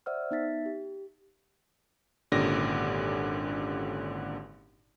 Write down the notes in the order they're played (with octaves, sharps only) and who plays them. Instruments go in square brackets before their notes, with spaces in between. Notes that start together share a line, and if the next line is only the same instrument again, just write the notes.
[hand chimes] C5 D5 E5 F#5 E6 F6
B3 D#4 E5 A6 B6
G4
[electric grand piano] G#1 A#2 D3 C#4 G4 A#6